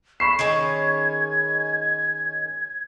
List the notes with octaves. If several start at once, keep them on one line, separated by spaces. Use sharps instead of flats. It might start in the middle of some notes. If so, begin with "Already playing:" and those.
B5 C#6 C7 E7
D#3 G#3 C#4 G#6